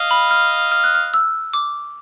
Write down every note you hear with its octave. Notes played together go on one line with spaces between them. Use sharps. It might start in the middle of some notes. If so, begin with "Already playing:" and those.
Already playing: D#5 F5
B5
F6
F6
F#6
F6
E6
D6